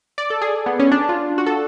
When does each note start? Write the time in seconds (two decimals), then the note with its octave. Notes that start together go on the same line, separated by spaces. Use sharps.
0.18 D5
0.30 A4
0.41 G#4
0.66 B3
0.79 C#4
0.92 D4
1.09 F4
1.38 F#4
1.46 A4